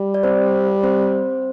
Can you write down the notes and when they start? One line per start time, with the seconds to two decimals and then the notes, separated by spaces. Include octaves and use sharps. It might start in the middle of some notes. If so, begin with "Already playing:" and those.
Already playing: G3
0.14 D5
0.23 C4 C5
0.83 C4 C5